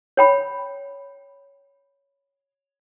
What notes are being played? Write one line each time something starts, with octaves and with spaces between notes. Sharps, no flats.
C#5 G5 B5